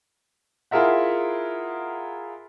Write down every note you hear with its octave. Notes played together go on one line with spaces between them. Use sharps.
E4 F4 G#4 A#4 E5 F#5